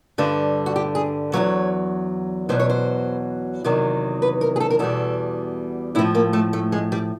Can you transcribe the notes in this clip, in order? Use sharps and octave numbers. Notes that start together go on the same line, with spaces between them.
G2 D3 G3
F#4
G4
G#4
E2 C#3 F#3 C#5
E2 B2 F#3 C5
C#5
C5
E2 C3 D#3 F#3
B4
A#4
G#4
A4
A#4
E2 B2 G3 A4
A2 F3 E4
A#3
A3
A3
G#3
G3